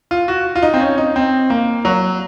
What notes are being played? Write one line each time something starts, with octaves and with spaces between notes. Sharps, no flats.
F4
F#4
F4
D#4
C4
C#4
D#4
C4
A#3
F#3